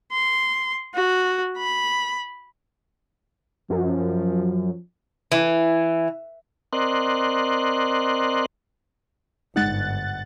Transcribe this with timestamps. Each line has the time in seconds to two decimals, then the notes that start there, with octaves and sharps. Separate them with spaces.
0.12 C6
0.95 F#4
1.58 B5
3.70 F#2 F3
5.32 E3
6.73 C4 A#4 D5 D#5 C6 F#6
9.56 G1 G#2 G#3 D#4 F#5 F#6 A6